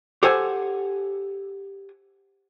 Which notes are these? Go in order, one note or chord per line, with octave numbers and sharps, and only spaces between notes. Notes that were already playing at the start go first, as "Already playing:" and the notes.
G4 A4 C5 F#5 G#5